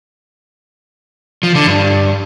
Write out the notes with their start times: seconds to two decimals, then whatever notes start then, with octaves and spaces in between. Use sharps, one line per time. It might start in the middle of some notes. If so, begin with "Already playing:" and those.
1.43 F3
1.55 D3
1.67 G2